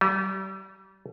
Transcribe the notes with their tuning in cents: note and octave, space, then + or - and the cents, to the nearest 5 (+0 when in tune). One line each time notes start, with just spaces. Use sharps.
G3 -35